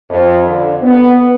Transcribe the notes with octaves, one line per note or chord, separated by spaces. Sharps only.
F2
D3
B3